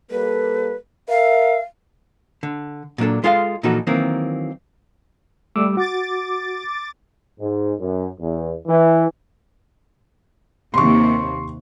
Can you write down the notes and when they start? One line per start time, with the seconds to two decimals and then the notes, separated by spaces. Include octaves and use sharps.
0.11 G3 A#3 A4 B4
1.09 A#4 E5 F5
2.43 D3
2.98 A#2 F#3 D4 A4
3.24 G#3 F4 G#4 A4 C5 F5
3.63 A#2 E3 F3 D#4 F#4 A4
3.87 D#3 E3 F#3 A#3 C4
5.56 G3 A3 D6 E6
5.77 F#4 D6 A6
7.39 G#2
7.80 F#2
8.21 E2
8.67 E3
10.74 D#2 C3 C6 C#6